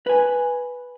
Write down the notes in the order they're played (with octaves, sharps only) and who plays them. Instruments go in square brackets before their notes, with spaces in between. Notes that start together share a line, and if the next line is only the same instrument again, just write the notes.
[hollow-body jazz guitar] B4 G#5